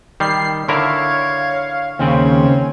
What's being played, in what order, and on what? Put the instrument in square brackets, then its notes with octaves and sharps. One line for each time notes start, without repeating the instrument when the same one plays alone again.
[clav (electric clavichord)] D#3 G3 [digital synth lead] C7
[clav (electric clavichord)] D3 E4 A#4 [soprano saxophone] C#5 [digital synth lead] F5
[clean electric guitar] D#2 C#3 [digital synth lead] C4 [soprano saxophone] C#4